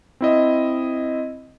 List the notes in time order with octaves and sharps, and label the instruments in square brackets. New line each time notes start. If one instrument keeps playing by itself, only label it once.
[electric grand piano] C4 E4 D#5